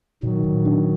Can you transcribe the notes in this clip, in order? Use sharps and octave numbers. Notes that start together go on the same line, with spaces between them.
A#2 D#3 F#3
A#2
D4